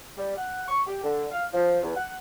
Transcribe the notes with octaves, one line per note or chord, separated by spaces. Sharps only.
G3
F#5
C#6
G4
D3
F5
F3
E2
F#5